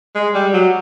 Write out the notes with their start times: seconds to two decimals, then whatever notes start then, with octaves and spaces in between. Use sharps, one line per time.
0.15 G#3
0.34 G3
0.53 F#3